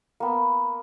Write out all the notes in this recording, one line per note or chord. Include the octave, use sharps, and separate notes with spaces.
A#3 B3